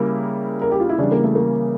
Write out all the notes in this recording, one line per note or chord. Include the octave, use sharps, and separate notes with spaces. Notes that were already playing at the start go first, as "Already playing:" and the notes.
Already playing: C#3 G3 A#3 E4 A#4
A#4
G4
F4
E4
C#3 E3 G3 D4
A#3
A3
A#3